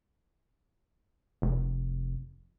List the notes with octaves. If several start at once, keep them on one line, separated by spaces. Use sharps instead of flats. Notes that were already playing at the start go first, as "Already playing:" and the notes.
F1